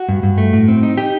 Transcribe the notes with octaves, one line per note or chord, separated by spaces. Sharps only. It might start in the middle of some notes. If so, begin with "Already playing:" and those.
Already playing: F#4
G2
G2
A3
A2
C4
D#4
D#4 G4